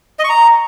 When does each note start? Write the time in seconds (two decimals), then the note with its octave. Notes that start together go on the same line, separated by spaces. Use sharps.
0.19 D#5
0.24 C#6
0.29 A#5